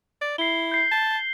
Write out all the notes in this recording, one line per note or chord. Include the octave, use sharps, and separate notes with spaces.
D5
E4 C7 G7
G6 C7
A5